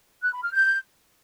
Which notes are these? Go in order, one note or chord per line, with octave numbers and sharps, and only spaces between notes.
F#6
B5
F6
G6